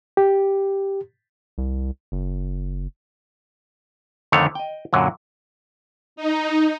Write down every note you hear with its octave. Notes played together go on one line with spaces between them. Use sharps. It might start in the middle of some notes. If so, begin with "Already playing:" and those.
G4
C2
F#1
F2 D3 D#3 A3 C#5
D#5 G5
F#2 A#2 D3 F#3
D#4